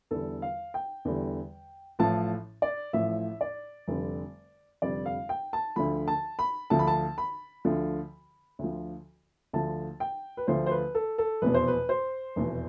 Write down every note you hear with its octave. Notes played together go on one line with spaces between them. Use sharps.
E2 D3 G3 A4
F5
G5
E2 D3 G3
A1 A2 F3 A5
D5
A1 A2 F3 E5
D5
F1 F2 D3 G3
F1 F2 D3 G3 D5
F5
G5
A5
D2 D3 F3 B5
A5
B5
D2 D3 F3 A5
B5
A5
B5
D2 D3 F3
D2 D3 F3
D2 D3 F3 A5
G5
B4
D2 D3 F3 C5
C5
B4
A4
A4
F1 E2 B2 B4
C5
B4
C5
F1 E2 B2